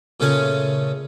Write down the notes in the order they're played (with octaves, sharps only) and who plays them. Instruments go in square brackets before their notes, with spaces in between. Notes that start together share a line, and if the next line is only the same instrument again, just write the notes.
[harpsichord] A#2 C#3 A3 C#4 G#5